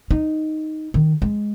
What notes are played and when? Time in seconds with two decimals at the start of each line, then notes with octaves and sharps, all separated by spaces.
0.11 D#4
0.94 D#3
1.22 G#3